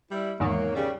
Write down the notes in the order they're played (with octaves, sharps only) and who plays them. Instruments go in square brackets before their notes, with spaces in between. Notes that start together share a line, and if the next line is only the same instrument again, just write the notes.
[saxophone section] G3 E4
[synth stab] E2 G#2 D#3 [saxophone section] F#3 A#3
[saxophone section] C#3 G3